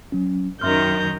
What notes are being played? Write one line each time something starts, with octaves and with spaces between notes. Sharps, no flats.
F#3 C#4
F#2 D#3 E5 A#5 C6 F6 G6